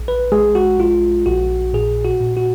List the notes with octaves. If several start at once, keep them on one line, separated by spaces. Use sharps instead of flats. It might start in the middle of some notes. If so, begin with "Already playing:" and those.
Already playing: A#1
B4
G#3 G#4
F#4
A#1 F4
A#1 F#4
A#2 G#4
F#4
A#2
F#4